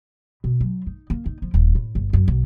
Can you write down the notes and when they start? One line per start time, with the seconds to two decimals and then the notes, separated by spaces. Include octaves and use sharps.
0.44 B2
0.60 F#3
0.87 D#4
1.10 A#3
1.26 D#4
1.42 F3
1.54 D#1
1.75 A2
1.95 G1
2.13 F#2
2.28 B1